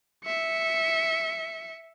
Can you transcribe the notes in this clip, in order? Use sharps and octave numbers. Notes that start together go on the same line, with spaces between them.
E5 C#7